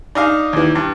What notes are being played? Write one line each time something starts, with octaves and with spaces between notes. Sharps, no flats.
D4 D#4 F5
D#2 E3
G2